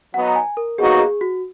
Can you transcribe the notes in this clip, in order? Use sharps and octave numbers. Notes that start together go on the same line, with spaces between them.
F#3 B3 D#4 F#5
A#5
G#5
A#4
B2 F#3 A#3 D#4 F#4 G#4
G#4
F#4